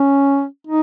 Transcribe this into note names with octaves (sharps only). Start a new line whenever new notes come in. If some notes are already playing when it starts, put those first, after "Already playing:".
Already playing: C#4
D#4